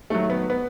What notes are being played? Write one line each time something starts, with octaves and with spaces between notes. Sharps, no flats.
D#3 F#3 A3
B3
B3